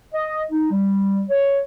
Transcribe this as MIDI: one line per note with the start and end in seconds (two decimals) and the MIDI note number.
0.13 0.42 75
0.51 0.70 63
0.71 1.23 55
1.30 1.60 73